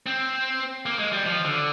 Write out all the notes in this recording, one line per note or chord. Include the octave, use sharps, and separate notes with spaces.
C4
A#3
G#3
G3
F3
D3